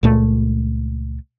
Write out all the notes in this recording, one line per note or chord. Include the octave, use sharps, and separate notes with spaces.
C#2 A#2 A3